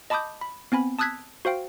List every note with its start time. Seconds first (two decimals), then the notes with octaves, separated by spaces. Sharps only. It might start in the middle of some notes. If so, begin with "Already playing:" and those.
0.10 D#5 A5 B5 D6 D#6 G6
0.41 B5
0.72 B3 C4 G#5 B5
0.99 A5 D#6 E6 F#6 G#6 B6
1.45 F#4 C5 F5 G5